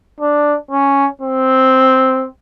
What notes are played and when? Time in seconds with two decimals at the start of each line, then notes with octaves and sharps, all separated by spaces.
0.21 D4
0.71 C#4
1.21 C4